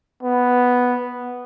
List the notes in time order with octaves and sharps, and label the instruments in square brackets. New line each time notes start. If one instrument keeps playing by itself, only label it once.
[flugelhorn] B3